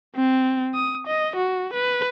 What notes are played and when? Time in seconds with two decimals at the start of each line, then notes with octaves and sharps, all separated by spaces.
0.16 C4
0.74 D#6
1.07 D#5
1.36 F#4
1.74 B4